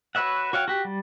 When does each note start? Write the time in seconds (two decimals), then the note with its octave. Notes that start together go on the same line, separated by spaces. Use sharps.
0.15 F#4 B4 C#5 E5 F#5
0.53 F#4 C#5 F5 G5
0.68 F#4 G4
0.85 G3